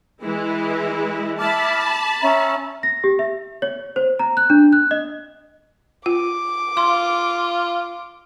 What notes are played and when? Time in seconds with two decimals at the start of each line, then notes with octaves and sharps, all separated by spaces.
0.23 E3 G#3 E4
1.39 E4 A5 B5 D6 F6
1.77 D6
2.20 C#4 E5 A#5
2.83 A#6
3.04 G4
3.19 E5
3.62 C#5
3.96 C5
4.19 A#5
4.37 F#6
4.50 D4
4.72 F#6
4.91 D#5
6.06 F4 D6
6.77 F4 C6